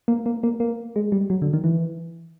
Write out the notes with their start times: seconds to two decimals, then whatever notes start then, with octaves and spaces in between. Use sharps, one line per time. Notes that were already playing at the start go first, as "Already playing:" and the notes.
0.08 A#3
0.26 A#3
0.43 A#3
0.60 A#3
0.96 G#3
1.12 G3
1.30 F#3
1.42 D3
1.53 D#3
1.64 E3